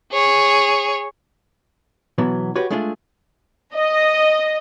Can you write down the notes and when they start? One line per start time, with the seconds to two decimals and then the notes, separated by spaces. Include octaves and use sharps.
0.12 G#4 C#5
2.18 B2 E3 F#3 B3
2.56 F#4 G4 B4 C#5
2.70 G#3 A3 D4 F4 G#4
3.75 D#5